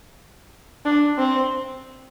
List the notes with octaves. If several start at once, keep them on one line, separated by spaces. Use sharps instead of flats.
D4
C4